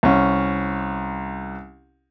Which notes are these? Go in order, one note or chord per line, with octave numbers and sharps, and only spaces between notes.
C2 C#4